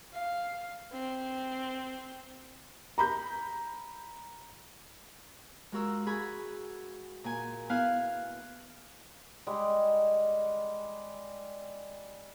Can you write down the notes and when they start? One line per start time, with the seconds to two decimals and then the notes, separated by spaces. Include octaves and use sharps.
0.14 F5
0.93 C4
2.98 A#5 B5 G6
5.72 G#3 F4 F#4 A#4 E6
6.06 F#4 G#4 G#5 B5
7.24 A#2 G#5
7.69 B3 E4 F5 G#5 F6 F#6
9.47 G3 G#3